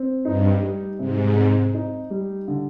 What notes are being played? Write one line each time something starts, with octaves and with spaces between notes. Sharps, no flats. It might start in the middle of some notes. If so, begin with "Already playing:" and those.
Already playing: C4
G2 D#4
G3
G#2 C3
C4
D#4
G3
D3